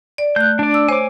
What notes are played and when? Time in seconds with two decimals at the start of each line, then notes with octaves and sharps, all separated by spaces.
0.18 D5
0.36 A3 F#6 G6
0.59 D4 D5
0.74 E6
0.88 C5 C#5 G#5 D6